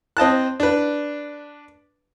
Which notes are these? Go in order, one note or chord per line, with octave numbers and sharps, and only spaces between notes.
C4 D#5 A5 F#6
D4 B4